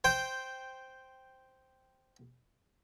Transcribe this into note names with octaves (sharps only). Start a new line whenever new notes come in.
C5 G5